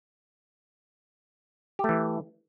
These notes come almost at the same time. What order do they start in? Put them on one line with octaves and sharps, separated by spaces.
G4 A3 E3